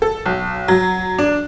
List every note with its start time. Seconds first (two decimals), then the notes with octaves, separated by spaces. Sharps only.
0.02 A4
0.26 B1
0.68 F#3
1.18 D4